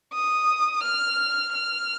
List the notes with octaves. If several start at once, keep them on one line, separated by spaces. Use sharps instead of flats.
D#6
F6
F6